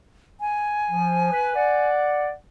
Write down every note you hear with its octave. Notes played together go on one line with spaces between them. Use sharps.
G#5
F3
B4
D5 F#5